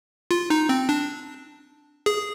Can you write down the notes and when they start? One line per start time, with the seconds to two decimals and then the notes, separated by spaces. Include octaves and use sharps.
0.31 F4
0.50 D#4
0.69 C4
0.89 D4
2.06 G#4